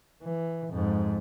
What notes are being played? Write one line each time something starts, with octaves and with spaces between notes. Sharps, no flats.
E3
F2 G#2